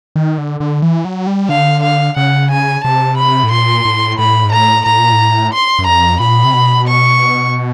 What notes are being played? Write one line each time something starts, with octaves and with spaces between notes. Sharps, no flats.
D#3
D3
D3
E3
F#3
G3
D3 F5
F5
C#3 F#5
G#5
C3 A5
B5
A2
A#2 C6
A2
A2 B5
G#2
A2 A#5
A2 A#5
A#2
A2
C6
F#2
F2 A#5
A#2 B5
C3
B2
C#6